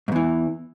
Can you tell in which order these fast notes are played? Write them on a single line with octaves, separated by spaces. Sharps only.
G#2 E2 E3